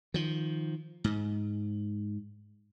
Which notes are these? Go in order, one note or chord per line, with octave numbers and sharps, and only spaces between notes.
D#3 F3
G#2